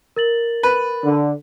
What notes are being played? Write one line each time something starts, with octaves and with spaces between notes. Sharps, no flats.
A#4 A6 F#7
B4
D3